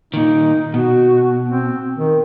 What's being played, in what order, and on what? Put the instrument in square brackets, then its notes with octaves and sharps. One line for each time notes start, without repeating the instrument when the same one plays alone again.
[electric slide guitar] A#2 D#3 [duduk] D#4
[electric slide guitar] B2 [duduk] F#4
[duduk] C4
D#3